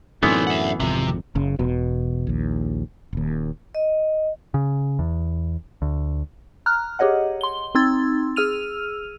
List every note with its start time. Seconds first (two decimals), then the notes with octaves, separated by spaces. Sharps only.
0.23 F#2 A2 D3 E3 B3 C4 D#4
0.47 E5 F#5
0.80 G#1 F2 C3
1.35 F#1 C#3
1.59 E1 B2
2.27 A#1 D#2
3.13 D#1 D#2
3.75 D#5
4.54 C#3
4.99 E2
5.82 D2
6.66 A#5 F6 F#6
6.99 G4 G#4 C#5 D#5 F#5
7.41 C6 G7
7.75 C4 D#4 C6 E6 G#6 A6
8.36 G#4 E6 F6 D#7 F7